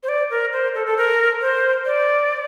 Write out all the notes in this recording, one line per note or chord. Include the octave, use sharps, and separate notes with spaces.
C5
D5
A#4
C5
A4
A4
A#4
C5
D5